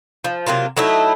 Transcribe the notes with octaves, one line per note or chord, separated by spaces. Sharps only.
F3
C3 F#3 A#3 F4
F#3 A3 D#4 E4